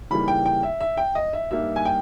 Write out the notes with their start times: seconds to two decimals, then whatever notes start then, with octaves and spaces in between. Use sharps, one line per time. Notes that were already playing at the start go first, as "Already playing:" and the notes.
0.10 C#3 E3 G3 A#3 D#4 B5
0.28 G5
0.46 G5
0.63 E5
0.80 E5
0.97 G5
1.15 D#5
1.33 E5
1.51 G2 G3 A#3 D#4 E5
1.76 G#5
1.85 G5